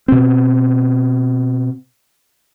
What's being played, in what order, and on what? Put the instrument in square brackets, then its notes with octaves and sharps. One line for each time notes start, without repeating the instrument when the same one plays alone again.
[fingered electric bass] B2 C4